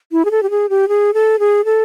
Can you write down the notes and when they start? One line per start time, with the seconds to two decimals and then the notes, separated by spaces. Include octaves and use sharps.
0.12 E4
0.25 G#4
0.31 A4
0.43 G4
0.50 G#4
0.70 G4
0.89 G#4
1.14 A4
1.39 G#4
1.65 A4